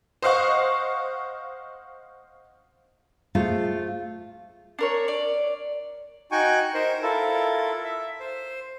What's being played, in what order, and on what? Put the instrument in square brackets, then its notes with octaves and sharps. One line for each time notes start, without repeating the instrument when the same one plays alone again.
[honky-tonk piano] C5 D#5 F5 F#5 C#6
[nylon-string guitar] A3 F4 G#4 C5 F5
[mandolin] D4 A#4 C#5
D5
[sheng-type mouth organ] D#4 F#4 G5 G#5 C#6
D#4 A#4 C5
E4 F4 A4 A#4
E5
C5